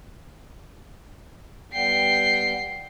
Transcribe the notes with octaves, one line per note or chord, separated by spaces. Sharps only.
G3 B3 G5 C7